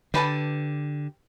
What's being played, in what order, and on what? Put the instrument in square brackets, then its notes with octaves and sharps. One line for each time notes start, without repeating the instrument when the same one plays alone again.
[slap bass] D3 [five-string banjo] G4 B4 A5